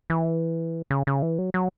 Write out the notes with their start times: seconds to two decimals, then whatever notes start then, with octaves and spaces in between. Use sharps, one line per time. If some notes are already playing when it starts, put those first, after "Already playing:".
0.10 E3
0.90 C#3
1.07 C#3
1.22 E3
1.39 F#3
1.54 F#3